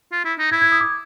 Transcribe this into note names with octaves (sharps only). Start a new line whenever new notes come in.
F4
E4
D#4
E4 G#6
G#6
D#6
D6